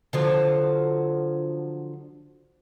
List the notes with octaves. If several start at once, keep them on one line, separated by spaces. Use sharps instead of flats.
D3 F3 F#3